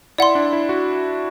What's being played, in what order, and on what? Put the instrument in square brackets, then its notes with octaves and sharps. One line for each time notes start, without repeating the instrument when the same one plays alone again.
[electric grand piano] E4 [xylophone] D5 F#5 C6
[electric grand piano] D4
E4
F#4